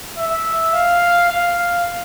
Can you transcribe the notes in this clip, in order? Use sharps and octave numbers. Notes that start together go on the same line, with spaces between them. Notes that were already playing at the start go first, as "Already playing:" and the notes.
E5
F5
F5